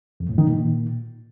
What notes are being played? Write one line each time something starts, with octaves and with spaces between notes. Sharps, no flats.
F2
A2
D#3
A#2